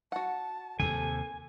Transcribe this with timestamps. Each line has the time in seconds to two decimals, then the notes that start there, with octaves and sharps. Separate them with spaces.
0.12 F#4 F#5 A5
0.80 D#2 C3 A4 G#5